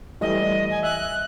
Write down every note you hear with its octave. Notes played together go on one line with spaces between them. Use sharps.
E3 G3 A3 D#5
G#5
E5 F#6